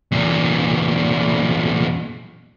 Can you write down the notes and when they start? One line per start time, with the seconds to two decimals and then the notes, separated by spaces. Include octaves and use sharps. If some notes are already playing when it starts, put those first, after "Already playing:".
0.12 E2 A#2